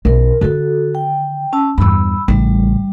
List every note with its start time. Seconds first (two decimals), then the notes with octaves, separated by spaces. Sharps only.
0.05 B1 D#3 A#4
0.41 D3 D#3 F#4 A4
0.95 G5
1.53 C#4 A5 E6
1.78 E2 G2 B5 E6
2.28 A1 C#3 G3